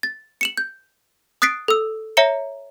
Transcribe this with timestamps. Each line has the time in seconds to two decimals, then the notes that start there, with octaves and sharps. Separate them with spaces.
0.03 A6
0.41 C#7 E7 F#7
0.57 G6
1.42 D#6 F#6 A6 B6 C7 D7
1.68 A4 E6
2.17 C#5 E5 A#5 A#6 C#7 G7